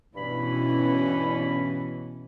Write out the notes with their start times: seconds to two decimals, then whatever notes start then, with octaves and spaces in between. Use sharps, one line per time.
0.15 G2 B2 E3 C#4 E4 B5